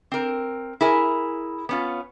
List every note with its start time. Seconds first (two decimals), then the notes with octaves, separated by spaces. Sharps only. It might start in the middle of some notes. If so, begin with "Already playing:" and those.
0.12 C4 A#4
0.81 E4 G#4 A#4 G#5
1.69 B3 C#4 F4